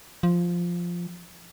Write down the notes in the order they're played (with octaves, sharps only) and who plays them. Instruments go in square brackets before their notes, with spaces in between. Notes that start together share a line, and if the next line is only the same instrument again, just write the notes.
[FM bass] F3